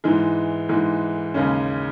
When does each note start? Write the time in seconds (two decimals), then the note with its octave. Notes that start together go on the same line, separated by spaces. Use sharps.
0.04 G#2 E3 G#3
0.69 G#2 E3 G#3
1.34 D#2 C#3 G#3 C#4